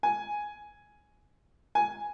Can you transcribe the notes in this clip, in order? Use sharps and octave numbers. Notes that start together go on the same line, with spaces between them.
G#5
G#5